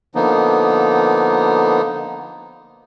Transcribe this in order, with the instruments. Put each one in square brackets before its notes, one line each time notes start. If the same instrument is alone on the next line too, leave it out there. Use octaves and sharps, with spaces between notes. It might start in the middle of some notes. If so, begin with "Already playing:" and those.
[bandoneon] D3 F3 A#3 B3 D#4